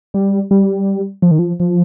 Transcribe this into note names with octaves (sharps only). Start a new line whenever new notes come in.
G3
G3
F3
D#3
F3
F3